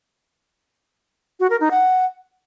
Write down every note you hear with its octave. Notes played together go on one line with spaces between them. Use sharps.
F#4
A#4
D#4
F#5